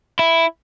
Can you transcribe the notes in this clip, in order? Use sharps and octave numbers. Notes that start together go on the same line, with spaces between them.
E4